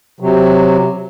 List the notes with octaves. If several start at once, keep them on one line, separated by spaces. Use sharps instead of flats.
C3 F#3